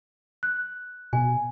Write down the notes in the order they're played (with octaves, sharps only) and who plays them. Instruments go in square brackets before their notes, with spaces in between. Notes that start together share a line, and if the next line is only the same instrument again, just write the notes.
[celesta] F#6
[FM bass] B2 [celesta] G#5